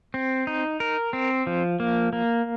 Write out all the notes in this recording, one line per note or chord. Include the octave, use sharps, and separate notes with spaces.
C4
D#4
A#4
C4
F3
A#3
A#3